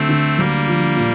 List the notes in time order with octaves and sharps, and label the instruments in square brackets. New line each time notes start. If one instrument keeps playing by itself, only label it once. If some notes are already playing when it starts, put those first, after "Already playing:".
Already playing: [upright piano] D2 [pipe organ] A3 C4
[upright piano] D3
[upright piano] D2 [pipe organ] G3 A#3
[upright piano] F3
A#2